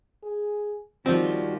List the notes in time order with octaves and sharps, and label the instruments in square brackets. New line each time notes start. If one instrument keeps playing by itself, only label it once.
[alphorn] G#4
[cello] D#2 [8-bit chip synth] F3 C4 [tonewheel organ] G3 F4 F#4 [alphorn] D4